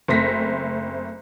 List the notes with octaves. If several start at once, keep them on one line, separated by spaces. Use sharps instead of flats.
F#1 A3 C4 A#6 B6